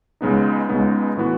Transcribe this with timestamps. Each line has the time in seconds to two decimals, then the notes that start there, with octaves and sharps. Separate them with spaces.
0.21 C#2 C#3 G#3 B3 D#4
0.69 C#2 C#3 G#3 B3 D#4
1.17 A2 E3 B3 F#4